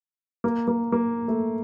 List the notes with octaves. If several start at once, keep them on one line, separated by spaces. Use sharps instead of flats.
A#3
A#3
A#3
A3